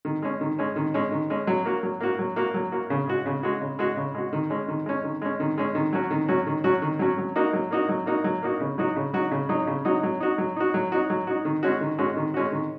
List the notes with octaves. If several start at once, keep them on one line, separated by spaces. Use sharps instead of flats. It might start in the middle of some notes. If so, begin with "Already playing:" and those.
D#3
G#3 C#4
D#3
G#3 C#4
D#3
G#3 C#4
D#3
G#3 C#4
F#3
A#3 F#4
F#3
A#3 F#4
F#3
A#3 F#4
F#3
A#3 F#4
C#3
G#3 F#4
C#3
G#3 F#4
C#3
G#3 F#4
C#3
G#3 F#4
D#3
G#3 C#4
D#3
G#3 C#4
D#3
G#3 C#4
D#3
G#3 C#4
D#3
F#3 C#4 F#4
D#3
F#3 C#4 F#4
D#3
F#3 C#4 F#4
D#3
F#3 C#4 F#4
F#3
A#3 D#4 F#4
F#3
A#3 D#4 F#4
F#3
A#3 D#4 F#4
F#3
A#3 D#4 F#4
C#3
F#3 D#4 F#4
C#3
F#3 D#4 F#4
C#3
F#3 D#4 F#4
C#3
F#3 D#4 F#4
F#3
D#4 F#4
F#3
D#4 F#4
F#3
D#4 F#4
F#3
D#4 F#4
D#3
G#3 C#4 F#4
D#3
G#3 C#4 F#4
D#3
G#3 C#4 F#4
D#3